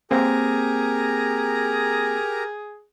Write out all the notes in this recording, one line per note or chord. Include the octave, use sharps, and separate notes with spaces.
A#3 C4 G4 G#4 A#4 A#5